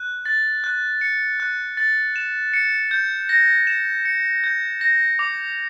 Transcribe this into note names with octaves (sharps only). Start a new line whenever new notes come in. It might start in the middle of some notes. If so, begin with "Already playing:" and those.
Already playing: F#6
A6
F#6
C#7
F#6
A6
E7
C#7
G6
A#6
E7
C#7
G6
A#6
D6